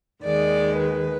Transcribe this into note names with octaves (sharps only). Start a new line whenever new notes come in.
D#2 D#3 G#3 D5
B4